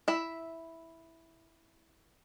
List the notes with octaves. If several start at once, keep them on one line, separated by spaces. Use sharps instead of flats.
E4 E5